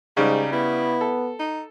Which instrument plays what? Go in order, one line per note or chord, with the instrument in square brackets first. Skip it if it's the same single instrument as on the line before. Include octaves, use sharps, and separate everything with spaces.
[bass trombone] G#2 [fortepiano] C#3 G3 [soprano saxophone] D#4
[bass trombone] B3 [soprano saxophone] E4
[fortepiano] A4
[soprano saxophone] D#4